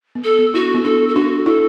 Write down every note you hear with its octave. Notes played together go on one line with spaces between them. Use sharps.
B3
A4
B3
E4 F#4
D4
B3
D4 A4
A4
D4 F#4
E4 A4